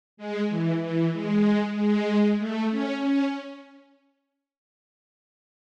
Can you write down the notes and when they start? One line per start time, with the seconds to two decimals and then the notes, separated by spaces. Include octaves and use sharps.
0.17 G#3
0.49 E3
0.81 E3
1.13 G#3
1.74 G#3
2.38 A3
2.69 C#4
3.01 C#4